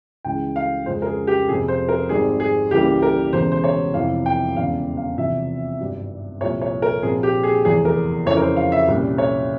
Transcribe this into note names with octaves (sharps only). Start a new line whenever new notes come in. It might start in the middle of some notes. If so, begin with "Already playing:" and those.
C#2 C#3 E3 G#3 G5
F5
F2 C#3 F3 G#3 C#4 C5
A#4
G#4
G4
F2 C3 F3 G#4
C5
A#4
G#1 G#2 G3 C4 G#4
G#4
C#2 C#3 E3 G3 A#3 G4
A#4
E1 E2 C#3 C5
C5
C#5
F2 C3 E3 F5
G5
E1 E2 C#3 F5
F5
E2 C3 F3 E5
G#1 G2 G3
C2 A#2 F3 C#5
C#5
A#4
A#1 A#2 F3 C4 G#4
G4
G#4
F1 E2 E3 G#4
A#4
F2 C#3 E3 C#5
A#4
C5
F5
E5
C2 A#2 G3 C#4
C#5